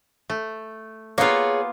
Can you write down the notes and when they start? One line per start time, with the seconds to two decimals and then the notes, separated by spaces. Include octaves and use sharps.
0.30 A3
1.18 A#3 B3 F4 G#4 C#5